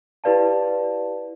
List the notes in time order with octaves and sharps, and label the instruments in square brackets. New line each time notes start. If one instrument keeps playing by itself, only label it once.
[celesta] E4 G4 B4 D5 F5 A5